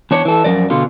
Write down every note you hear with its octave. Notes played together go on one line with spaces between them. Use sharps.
E2 D4 C#5
E3 A4
F#2 F3 A#4 D5
B2 D3 F4